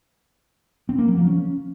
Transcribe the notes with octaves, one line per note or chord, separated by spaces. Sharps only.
C4
A#3
F#3
F3
C#4